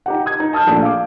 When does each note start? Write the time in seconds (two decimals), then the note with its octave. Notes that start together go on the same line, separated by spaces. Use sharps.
0.06 D#4 G4 F#5
0.26 D#6 G#6
0.40 D#4
0.53 A5 D#6 F6 G6
0.67 A#1 A3 D4 D#6
0.82 F5 D6